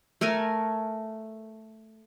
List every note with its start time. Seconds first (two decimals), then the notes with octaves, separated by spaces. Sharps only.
0.21 A3 A4 A#4 G#5